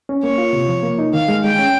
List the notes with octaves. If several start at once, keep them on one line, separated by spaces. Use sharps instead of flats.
C#4
A#3 C#5
F4
C3
F3
A#3
D#4
D#3 F5
G#3
G#3 G5
C#4